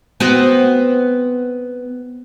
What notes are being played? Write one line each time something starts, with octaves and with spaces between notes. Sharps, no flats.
B3 C4 F#4